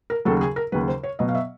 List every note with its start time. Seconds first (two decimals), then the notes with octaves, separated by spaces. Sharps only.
0.10 A#4
0.25 D#2 C#3 F#3 A4
0.41 G#4
0.56 A#4
0.72 D#2 C#3 F#3 B4
0.88 C5
1.03 C#5
1.19 B2 F#3 B3 D#5
1.29 F5
1.35 E5